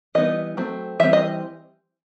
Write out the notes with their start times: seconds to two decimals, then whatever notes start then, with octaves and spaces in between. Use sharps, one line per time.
0.15 E3 G3 B3 D#4 D#5
0.57 F#3 A3 C4
1.00 E3 G3 C4 E5
1.13 D#5